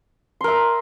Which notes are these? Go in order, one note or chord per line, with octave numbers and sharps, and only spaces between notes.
A#4 E5 C6